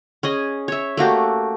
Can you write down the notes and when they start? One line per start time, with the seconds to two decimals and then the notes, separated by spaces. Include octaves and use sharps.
0.23 C#4 G#4 D#5
0.68 C#5 E5
0.97 A3 A#3 F#4 G4